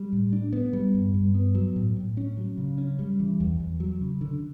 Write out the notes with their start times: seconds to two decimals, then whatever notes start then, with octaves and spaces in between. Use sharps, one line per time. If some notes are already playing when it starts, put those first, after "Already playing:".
Already playing: G3
0.13 A2
0.33 D4
0.53 B3
0.73 G3
0.94 G2
1.14 G2
1.35 B3
1.55 F#3
1.76 A2
1.96 A2
2.17 C#4
2.37 F#3
2.57 C#3
2.78 C#4
2.99 G3
3.20 E3
3.40 E2
3.60 E2
3.80 F#3
4.01 C#3
4.21 D3